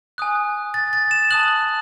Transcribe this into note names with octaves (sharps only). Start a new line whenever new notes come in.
G#5 D#6 F#6
A6
A6
E7
A5 D#6 F#6 F#7